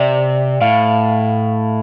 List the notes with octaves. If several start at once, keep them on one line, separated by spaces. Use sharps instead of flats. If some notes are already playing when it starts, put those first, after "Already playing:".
Already playing: C3 D5
A2 F5